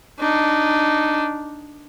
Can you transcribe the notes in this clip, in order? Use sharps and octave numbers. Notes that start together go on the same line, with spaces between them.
D4 D#4